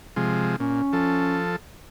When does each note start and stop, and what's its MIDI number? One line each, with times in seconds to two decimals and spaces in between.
0.16 0.56 48
0.16 0.56 53
0.16 0.56 56
0.60 0.82 46
0.60 1.40 61
0.93 1.56 53
0.93 1.56 69